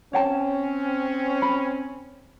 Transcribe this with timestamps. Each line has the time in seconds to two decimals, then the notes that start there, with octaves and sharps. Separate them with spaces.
0.13 C4 C#4 C#5 G5 A5
1.42 B5